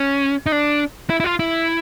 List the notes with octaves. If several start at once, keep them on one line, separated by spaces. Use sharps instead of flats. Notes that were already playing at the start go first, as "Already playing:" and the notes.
Already playing: C#4
D#4
D4
E4
E4
F4
E4